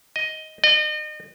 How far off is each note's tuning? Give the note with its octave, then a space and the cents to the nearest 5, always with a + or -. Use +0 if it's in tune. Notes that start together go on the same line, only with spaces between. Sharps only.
D#5 +10
D#5 -35